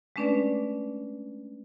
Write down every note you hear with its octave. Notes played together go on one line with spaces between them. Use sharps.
G#3 A3 C#4 D4 B4 D5